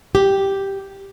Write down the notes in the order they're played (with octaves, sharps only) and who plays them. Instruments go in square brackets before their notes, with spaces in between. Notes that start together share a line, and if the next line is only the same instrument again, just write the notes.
[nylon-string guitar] G4